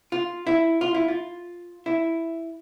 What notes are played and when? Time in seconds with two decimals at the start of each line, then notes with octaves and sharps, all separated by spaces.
0.12 F4
0.47 E4
0.81 F4
0.94 E4
1.08 F4
1.86 E4